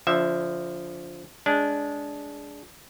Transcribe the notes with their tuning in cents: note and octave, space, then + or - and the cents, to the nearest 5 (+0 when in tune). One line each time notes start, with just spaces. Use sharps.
D3 -35 F3 +0 E5 +0
G#3 +0 D4 -20